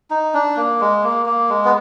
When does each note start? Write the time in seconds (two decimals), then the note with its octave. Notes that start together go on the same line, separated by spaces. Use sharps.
0.10 D#4
0.34 D4
0.57 A#3
0.81 G#3
1.04 A#3
1.26 A#3
1.49 G#3
1.65 B3